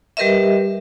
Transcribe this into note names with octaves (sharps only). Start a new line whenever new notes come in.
G3 G4 A#4 B4 D#5 E5